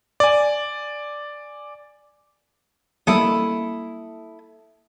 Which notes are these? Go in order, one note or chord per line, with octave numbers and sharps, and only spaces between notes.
D5 G#5
F#3 G3 A#3 E4 A4 D#6